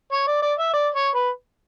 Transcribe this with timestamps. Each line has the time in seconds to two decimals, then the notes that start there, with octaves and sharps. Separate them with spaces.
0.12 C#5
0.27 D5
0.42 D5
0.59 E5
0.73 D5
0.94 C#5
1.15 B4